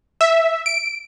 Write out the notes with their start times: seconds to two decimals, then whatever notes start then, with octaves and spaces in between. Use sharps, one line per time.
0.21 E5
0.66 D7